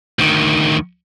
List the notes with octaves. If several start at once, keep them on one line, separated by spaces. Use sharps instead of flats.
D2 D#3